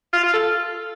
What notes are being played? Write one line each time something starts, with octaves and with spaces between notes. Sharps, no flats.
F4
F4
A4